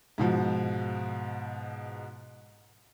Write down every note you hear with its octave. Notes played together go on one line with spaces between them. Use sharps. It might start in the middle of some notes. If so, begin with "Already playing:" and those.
G#2 B2 F3